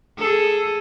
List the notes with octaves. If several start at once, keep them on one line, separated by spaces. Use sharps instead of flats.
G#4 A4